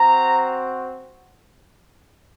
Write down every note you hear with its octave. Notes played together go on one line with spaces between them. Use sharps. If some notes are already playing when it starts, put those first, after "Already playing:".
Already playing: C4 F#4 A#5